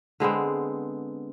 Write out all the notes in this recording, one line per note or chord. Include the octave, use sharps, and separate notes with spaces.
D3 G#3 B3 C4